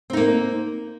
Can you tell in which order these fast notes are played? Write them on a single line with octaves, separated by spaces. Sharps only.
C4 D#4 A#3